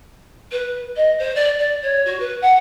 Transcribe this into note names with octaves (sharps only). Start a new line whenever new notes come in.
B4
D#5
C5
D5
D5
C#5
F#4
B4
F#5